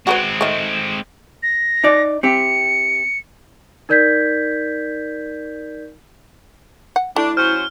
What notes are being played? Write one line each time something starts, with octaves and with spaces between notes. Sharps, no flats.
G#3 C4 F#4 A#4 B4
D#3 A3
A#6
D#4 D5
C4 E4 G4 C#7
D#4 A#4 D5 G6 G#6 B6
F#5
A3 D4 E4
F#3 C#4 C5 F6